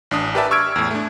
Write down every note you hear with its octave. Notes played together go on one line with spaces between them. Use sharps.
A1 D4 D#6
G4 A#4 B4 D5 E5 A5
C#6 E6 F6 G#6 D7
E2 A2
A3 D4